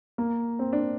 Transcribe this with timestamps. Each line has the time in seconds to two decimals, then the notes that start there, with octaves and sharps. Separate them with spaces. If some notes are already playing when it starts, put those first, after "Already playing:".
0.18 A#3
0.59 C4
0.73 D4